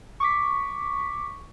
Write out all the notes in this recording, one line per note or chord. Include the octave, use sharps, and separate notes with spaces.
C#6 D6 B6